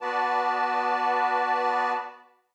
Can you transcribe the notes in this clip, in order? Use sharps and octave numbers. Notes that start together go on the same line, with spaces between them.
B3 F#4 B4 D5 A5